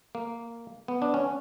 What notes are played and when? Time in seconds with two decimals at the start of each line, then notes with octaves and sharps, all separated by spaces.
0.15 A#3
0.88 B3
1.02 D4
1.14 C#4